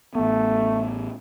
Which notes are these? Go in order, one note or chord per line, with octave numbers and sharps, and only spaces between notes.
A1 A3 B3